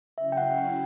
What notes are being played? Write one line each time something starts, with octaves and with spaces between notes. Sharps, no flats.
C#3 F#3 C#4 E4 E5
G5
F#5
G5